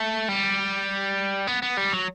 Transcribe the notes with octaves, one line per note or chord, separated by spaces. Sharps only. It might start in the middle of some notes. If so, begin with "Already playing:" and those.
Already playing: A3
G3
B3
B3
G3
F#3